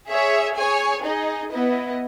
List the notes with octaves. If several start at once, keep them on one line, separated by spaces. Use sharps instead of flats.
G#4 C#5 E5
G#4 C#5 G#5
D#4 G#4 D#5
B3 E4 B4 D#5